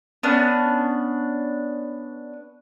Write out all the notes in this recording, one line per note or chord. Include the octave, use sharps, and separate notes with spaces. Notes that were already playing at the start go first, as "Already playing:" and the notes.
B3 C#4 D4